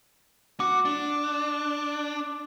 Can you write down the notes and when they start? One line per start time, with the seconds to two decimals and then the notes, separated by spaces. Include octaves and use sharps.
0.60 F#4 D6
0.85 D4